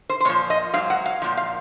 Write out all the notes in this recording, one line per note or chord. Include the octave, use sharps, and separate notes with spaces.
C5
C5
A#2 F3 C#5
D#5
G#2 F#3 F5
F#5
F5
A#2 F3
F5